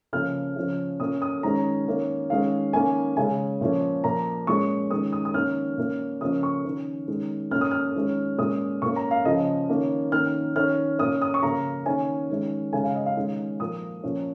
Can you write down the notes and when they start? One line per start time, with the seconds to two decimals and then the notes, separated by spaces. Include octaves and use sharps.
0.13 C#3 F3 A#3 C#4 F6
0.56 C#3 F3 C#4
1.00 A#2 A#3 C#4 D#6
1.22 D#6
1.43 D#3 G#3 C#4 A#5
1.87 D#3 A#3 C#4
2.30 D#3 G#3 C#4 F5
2.73 D#3 A#3 C#4 G#5
3.17 C#3 G#3 C#4 G#5
3.61 A#2 F3 C#4
4.04 A#2 F3 A#3 A#5
4.47 A#2 G#3 C#4 C#6
4.91 D#3 G#3 C#4 D#6
5.12 D#6
5.25 D#6
5.34 D#3 A#3 C#4 F6
5.78 A#2 A#3 C#4
6.21 C#3 F3 A#3 C#4 D#6
6.43 C#6
6.65 D#3 C#4
7.08 D#3 G#3 C#4
7.51 A#2 A#3 C#4 F6
7.61 D#6
7.71 F6
7.95 D#3 G#3 C#4
8.38 A#2 G#3 C#4 D#6
8.82 A#2 C#6
8.85 A#3 C#4
8.96 A#5
9.11 F5
9.25 C#3 F3 C#4 D#5
9.69 D#3 A#3 C#4
10.12 D#3 A#3 C#4 F6
10.56 D#3 C#4 F6
10.99 A#2 A#3 C#4 D#6
11.22 D#6
11.34 C#6
11.43 C#3 A#3 C#4 A#5
11.86 D#3 A#3 C#4 G#5
12.30 D#3 G#3 C#4
12.73 C#3 G#3 C#4 G#5
12.84 F5
12.95 D#5
13.06 F5
13.17 D#3 G#3 C#4
13.60 A#2 F3 A#3 D#6
14.04 A#2 F3 C#4